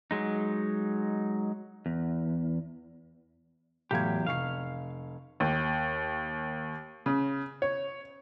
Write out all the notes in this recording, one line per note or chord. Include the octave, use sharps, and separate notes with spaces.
F#3 G#3 D#4
E2
E2 A2 F#3 G4 F5 G#6
F1 F5 C#6 C7
D#2
C#3
C#5